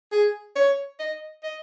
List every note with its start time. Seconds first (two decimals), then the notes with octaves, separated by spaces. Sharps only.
0.12 G#4
0.56 C#5
1.00 D#5
1.43 D#5